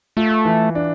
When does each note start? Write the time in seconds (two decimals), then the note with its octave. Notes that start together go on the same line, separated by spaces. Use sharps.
0.17 A3 F4
0.45 E3
0.75 D4